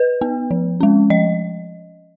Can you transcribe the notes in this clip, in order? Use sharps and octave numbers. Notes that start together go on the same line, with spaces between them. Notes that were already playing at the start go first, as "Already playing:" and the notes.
Already playing: B4
B3
F3
G#3 C#4
F3 D#5